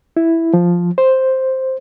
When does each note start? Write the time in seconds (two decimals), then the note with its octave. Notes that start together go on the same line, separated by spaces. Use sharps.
0.17 E4
0.53 F3
0.98 C5